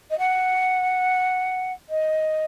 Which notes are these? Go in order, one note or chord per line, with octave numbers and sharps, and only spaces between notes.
D#5
F#5
D#5